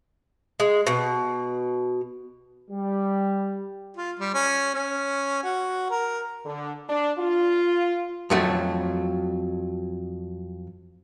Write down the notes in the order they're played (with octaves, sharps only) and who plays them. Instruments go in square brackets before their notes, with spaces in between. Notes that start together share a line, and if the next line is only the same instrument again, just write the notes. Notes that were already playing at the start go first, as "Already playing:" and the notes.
[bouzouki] G#3
B2
[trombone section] G3
[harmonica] F4
G3
C#4
C#4
F#4
A#4
[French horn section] D3
D4
F4
[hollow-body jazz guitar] F2 F#3 A3